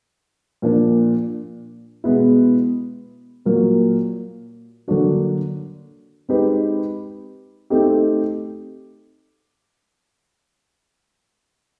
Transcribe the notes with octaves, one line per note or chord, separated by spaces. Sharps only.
A#2 F3 A#3 D4
B2 G#3 B3 E4
A#2 F#3 A#3
D3 F#3 A#3 D4 F#4
G#3 C4 D#4 G4 B4
A3 C4 D#4 G4